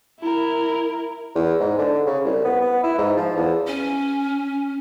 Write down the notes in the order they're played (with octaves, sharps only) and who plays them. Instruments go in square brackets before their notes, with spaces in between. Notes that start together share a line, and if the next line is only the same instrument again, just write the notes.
[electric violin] E4 A#4
[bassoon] E2
G#2
D3
C#3
C2
B3
B3
E4
G#2
F3
E2
[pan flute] C#4